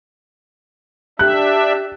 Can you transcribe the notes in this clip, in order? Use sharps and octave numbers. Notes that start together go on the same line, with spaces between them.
D4 G4 E5 F#6